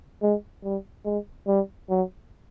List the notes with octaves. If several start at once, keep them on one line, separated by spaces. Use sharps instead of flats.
G#3
G3
G#3
G3
F#3